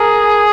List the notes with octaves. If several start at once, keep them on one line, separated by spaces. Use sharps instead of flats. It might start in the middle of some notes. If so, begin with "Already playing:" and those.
Already playing: G#4 A#4